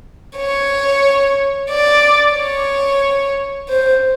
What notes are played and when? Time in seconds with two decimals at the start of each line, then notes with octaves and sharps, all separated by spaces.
0.37 C#5
1.70 D5
2.36 C#5
3.69 C5